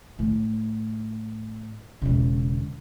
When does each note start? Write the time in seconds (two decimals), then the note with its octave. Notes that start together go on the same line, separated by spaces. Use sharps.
0.19 A2
2.02 E1 C#3